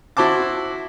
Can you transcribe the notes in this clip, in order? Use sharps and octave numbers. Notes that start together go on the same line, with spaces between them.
E4 F#4 C5 A5 D6